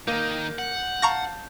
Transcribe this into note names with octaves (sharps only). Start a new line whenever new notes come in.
D#3 A#3 D#4 G6
F#5
F5 A5 A#5 C#6 A#6